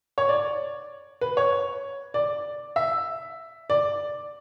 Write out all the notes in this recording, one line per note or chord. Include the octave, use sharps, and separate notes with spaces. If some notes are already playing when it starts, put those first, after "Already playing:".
C#5
D5
B4
C#5
D5
E5
D5